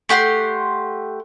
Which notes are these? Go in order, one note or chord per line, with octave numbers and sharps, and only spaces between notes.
A3 G4 F#5 C6